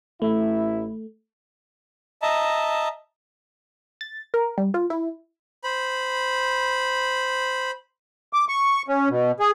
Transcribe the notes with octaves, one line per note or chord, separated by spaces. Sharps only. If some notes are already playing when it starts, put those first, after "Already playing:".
A1 A3 E4
D#5 E5 A5 A#5
A6
A#4
G3
F4
E4
C5 B5
D6
C#6
C#4
B2
G#4